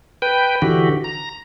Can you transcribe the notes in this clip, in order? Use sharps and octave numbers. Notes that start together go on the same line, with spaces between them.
B4 G5
D3 E3 F#4 G4
A#5